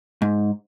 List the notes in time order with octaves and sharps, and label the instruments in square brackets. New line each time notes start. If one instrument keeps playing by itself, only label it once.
[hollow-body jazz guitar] G#2